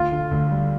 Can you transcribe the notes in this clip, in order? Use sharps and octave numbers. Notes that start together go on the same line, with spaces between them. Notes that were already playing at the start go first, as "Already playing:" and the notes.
Already playing: D2 F4
D3
D2
G3